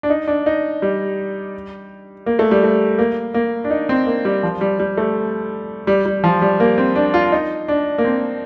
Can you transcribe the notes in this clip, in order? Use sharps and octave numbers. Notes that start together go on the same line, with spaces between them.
D4
D#4
D4
D#4
G3
A#3
A3
G3
A3
A#3
A#3
D4
D#4
C4
A#3
G3
F3
G3
G3
A3
G3
G3
F3
G3
A#3
C4
D4
F4
D#4
D4
A#3
C4